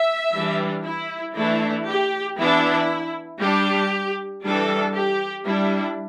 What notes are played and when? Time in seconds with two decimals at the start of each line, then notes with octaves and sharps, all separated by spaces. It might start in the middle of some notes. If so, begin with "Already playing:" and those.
Already playing: E5
0.34 E3 G3 D4
0.85 E4
1.35 E3 A3 D4 E4
1.87 G4
2.38 E3 B3 D4 E4
3.40 G3 D4 G4
4.43 E3 G3 D4 A4
4.95 G4
5.45 G3 D4 E4